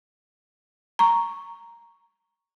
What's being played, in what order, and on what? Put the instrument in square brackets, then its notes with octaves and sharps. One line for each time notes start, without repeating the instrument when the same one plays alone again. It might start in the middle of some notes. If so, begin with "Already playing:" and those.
[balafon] A#5 C#6